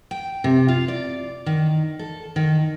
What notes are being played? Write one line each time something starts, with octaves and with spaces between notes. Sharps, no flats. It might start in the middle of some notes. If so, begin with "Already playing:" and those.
G5
C3
F4
D5
D#3
A4
D#3